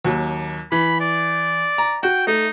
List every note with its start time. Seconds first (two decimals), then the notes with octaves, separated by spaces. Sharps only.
0.05 D#2 F#3
0.72 E3 B5
1.00 D5
1.78 A#5
2.03 F#4 G5
2.27 A3 D#4